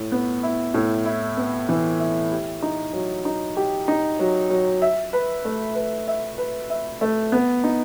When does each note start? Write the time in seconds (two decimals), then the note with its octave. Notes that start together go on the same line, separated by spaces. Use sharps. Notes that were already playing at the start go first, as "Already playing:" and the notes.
Already playing: A2
0.12 B3
0.43 E4
0.74 A2
1.06 E4
1.37 B3
1.69 E3
2.00 E4
2.31 G4
2.62 D#4
2.93 F#3
3.25 D#4
3.57 G4
3.88 D#4
4.19 F#3
4.50 F#3
4.82 E5
5.13 B4
5.45 A3
5.75 B4
6.08 E5
6.38 B4
6.70 E5
7.01 A3
7.32 B3
7.64 D#4